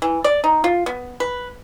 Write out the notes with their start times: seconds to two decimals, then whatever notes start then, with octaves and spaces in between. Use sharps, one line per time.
0.02 E3
0.24 D5
0.44 D#4
0.64 F4
0.86 B3
1.20 B4